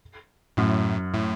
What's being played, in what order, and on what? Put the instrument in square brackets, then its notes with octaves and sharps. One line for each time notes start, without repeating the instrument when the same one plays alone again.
[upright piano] F#2 [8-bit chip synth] A2
[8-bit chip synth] A2